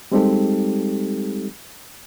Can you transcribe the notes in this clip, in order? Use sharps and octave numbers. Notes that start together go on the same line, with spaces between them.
G3 G#3 C4 D#4 G4 A4